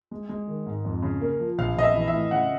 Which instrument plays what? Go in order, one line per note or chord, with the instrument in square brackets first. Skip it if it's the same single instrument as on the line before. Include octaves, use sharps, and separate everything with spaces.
[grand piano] G#3
G#3
D#3
G#2
F2
C#3
A#3
F3
[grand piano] A#1 [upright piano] F5
[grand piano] A#1 [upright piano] D#5
[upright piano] E5
[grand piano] E3
[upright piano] E5
[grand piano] A2
[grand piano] C#3 [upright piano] F#5